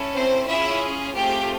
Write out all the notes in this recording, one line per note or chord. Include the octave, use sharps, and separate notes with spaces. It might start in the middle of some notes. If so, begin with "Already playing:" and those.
Already playing: C#4 E4 A4
C4 C5
C#4 E4 F4 G#4 E5
A3 C4 F4 G4 G#4 G5